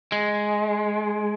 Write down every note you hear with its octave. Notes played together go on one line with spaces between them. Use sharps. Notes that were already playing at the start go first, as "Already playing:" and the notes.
G#3